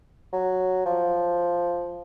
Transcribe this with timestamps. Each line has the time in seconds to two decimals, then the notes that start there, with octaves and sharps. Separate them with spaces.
0.33 F#3
0.86 F3